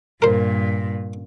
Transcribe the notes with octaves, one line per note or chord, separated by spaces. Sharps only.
G2 A#2 A#4 C5